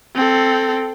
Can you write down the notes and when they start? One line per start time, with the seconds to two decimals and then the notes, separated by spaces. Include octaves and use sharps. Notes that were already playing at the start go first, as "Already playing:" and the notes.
0.15 C4 A4